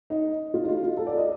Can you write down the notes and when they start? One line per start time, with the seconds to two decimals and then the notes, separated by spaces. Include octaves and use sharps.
0.10 D#4
0.54 F4
0.64 D#4
0.68 F4
0.83 F4
0.97 A4
1.07 D5
1.17 D#5